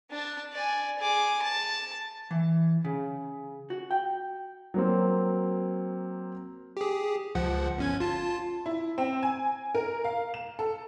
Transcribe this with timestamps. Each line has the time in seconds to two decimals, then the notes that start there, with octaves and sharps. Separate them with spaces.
0.11 D4 A5
0.53 D5 G#5
0.99 G#4 D6
1.42 A5
2.31 E3
2.85 C#3
3.70 F#4
3.91 G5
4.74 F#3 A#3 C4
6.77 G4 G#4
7.35 C#2 F3 F#5
7.78 G1 C#4 G#6
8.00 F4 A5
8.66 E4
8.98 C4
9.23 G#5
9.75 A#4
10.05 F5
10.34 E7
10.59 A4